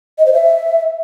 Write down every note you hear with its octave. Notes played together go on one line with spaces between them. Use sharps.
D#5
C5
E5